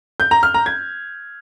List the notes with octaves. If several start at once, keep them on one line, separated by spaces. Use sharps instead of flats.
G6
A#5
F6
A#5
G#6